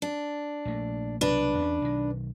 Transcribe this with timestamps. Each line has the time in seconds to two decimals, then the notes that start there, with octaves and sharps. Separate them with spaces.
0.02 D4
0.65 A#1 A3 A#3
1.21 C2 B2 F#3 D4 B4
1.58 E2 A3 C#4
1.82 B1 D#3